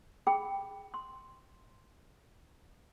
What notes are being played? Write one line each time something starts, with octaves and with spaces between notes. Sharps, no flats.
G#4 G5 B5
C6